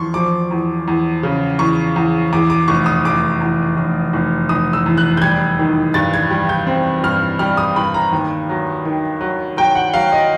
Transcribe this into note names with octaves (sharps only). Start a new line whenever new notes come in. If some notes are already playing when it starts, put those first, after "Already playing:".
Already playing: E2 F3 C6 C#6
F3 D6
E2
E2
C#3
E2 C#6
E2
E2 D6
D6
F1 C#6
D#6
F1 D6
E2
F1
F1
F1 D#6
E6
E2
F#6
G6
G3 G#6
D#3
G2 A6
G#6
G3
G6
C4
G2 F6
G3 F6
D#6
G2 B5
A#5
D#2
F#3
D#3
F#3
F#3 G5
F#5
F#3 F5
D#5